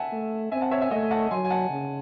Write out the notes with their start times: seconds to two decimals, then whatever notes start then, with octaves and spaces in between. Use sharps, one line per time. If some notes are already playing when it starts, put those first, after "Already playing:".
Already playing: E5 F#5 G#5 A5
0.12 A3
0.52 C4 E5 G#5
0.61 F#5 A5
0.71 C#5 E5
0.81 E5 G#5
0.91 A3 D#5 F#5
1.11 F#5 A5
1.31 F#3 G#5 C6
1.44 G#5
1.50 F#5 A5
1.70 C#3